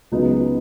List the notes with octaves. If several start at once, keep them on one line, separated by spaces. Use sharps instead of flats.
C#2 C#3 F#3 B3 D#4